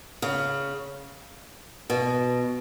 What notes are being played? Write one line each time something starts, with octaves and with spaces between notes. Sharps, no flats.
C#3
B2